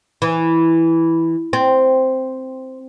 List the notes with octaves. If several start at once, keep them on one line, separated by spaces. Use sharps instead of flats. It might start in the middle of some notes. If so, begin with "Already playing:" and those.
E3
C4